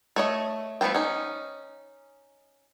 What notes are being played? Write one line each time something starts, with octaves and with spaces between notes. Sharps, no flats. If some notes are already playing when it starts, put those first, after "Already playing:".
A3 C#5 D#5
F3 A3 B3 C5 G5
C#4 D#4